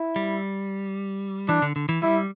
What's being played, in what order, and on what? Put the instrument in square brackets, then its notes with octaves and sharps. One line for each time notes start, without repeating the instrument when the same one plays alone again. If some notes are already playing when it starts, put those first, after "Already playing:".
Already playing: [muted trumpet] E4
[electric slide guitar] G3
[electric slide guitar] E3 [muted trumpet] D4
[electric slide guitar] D3
D3
E3
[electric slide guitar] G3 [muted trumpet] E4